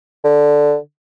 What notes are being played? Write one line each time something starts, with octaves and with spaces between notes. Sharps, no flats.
D3